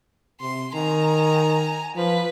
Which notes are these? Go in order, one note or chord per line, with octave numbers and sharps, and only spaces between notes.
C3 C6
D#3 G#5 A#5
F3 B4